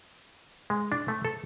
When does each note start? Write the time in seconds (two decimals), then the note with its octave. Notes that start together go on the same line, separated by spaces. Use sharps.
0.70 G#3
0.92 D4
1.08 A3
1.25 A4